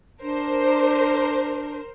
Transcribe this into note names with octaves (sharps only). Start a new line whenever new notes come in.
D4 A#4 C5